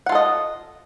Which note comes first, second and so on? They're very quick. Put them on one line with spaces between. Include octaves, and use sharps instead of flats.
F#5 F4 A4 D#5